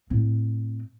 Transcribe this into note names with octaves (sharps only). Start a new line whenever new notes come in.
A2 C4